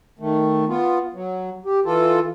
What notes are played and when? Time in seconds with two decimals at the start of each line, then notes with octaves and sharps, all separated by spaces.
0.19 D#3 A3
0.68 B3 F4
1.13 F#3
1.65 G4
1.85 E3 F4 A4